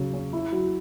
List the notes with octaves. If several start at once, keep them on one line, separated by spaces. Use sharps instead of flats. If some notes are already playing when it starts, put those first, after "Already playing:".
Already playing: C#3 F#3 F#4
C#4
E4
F#3